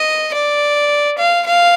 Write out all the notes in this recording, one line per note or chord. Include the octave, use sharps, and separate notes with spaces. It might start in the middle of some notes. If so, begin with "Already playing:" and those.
Already playing: D#5
D5
F5
F5